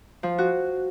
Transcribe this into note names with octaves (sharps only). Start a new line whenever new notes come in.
F3
F#4